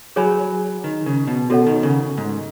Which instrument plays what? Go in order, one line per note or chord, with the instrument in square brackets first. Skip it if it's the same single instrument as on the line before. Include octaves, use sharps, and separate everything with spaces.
[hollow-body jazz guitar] F#3 [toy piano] G#4 C#5 G#5 B5
[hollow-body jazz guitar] D#3
C#3
B2
[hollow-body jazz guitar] B2 [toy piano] F#4 A4 C#5 F#5
[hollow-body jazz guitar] D#3
C#3
G#2